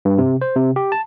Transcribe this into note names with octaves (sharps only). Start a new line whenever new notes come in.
G2
C3
C5
C3
G4
A5